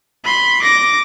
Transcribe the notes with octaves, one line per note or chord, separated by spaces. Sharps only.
B5 C6
D6 A#6